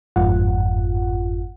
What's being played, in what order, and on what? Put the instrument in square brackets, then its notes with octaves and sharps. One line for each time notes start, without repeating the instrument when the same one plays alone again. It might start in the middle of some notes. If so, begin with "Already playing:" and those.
[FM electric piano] G1 F2 G#2 F4 F#5